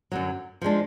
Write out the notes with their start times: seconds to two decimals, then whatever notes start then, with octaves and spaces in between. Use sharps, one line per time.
0.12 F#2 D3 F#3
0.62 F3 G#3 D4